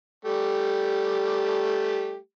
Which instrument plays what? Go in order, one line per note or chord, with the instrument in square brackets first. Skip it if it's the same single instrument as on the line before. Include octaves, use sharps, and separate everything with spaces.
[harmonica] G3 A3 G4